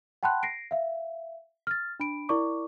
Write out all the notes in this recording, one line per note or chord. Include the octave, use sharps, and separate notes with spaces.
F#5 G5 A5 B5 C6 F#6
A#6 C7 D7
E5 F5
F6 A6
D4 B5 D7
E4 A#4 D5 C#6 D6